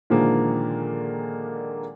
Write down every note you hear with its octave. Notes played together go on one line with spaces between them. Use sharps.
A#2 D3 D#3 F3 G#3 A#3